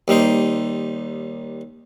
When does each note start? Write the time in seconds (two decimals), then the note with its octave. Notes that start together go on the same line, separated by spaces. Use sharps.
0.08 D#2 G3 D#4 C5